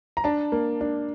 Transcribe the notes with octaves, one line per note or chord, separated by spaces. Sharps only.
A#5
D4 A5
A#3
D4